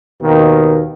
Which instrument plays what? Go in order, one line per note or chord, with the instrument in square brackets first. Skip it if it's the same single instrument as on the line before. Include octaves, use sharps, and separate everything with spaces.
[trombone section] D#2 B2 D#3 A#3